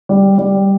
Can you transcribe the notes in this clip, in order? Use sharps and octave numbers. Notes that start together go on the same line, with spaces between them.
G3
G3